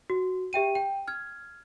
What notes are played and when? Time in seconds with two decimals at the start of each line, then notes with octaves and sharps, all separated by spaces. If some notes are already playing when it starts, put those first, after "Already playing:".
0.10 F#4
0.53 G4 E5 G5 D#7
0.75 G5
1.08 F6 G#6